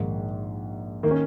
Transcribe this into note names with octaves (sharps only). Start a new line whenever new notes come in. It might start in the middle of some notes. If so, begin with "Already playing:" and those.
Already playing: A#1 G#2 D#3
D#3 A#3
C#4